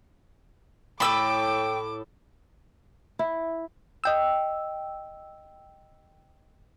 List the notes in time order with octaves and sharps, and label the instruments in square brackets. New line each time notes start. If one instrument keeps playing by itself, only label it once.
[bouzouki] A2 A4 [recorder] G5 [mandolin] B5 E6 [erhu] D6
[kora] E4
[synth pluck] D#5 G5 E6